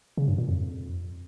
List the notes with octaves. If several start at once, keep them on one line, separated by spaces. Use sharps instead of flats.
C#3
G2
A#2
F2